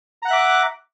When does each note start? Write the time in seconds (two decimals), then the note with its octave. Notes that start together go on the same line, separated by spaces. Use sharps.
0.22 A#5
0.25 F#5
0.28 F#6
0.30 E5
0.33 D6